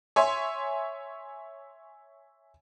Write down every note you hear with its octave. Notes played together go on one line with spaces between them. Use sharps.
C#5 E5 G#5 C6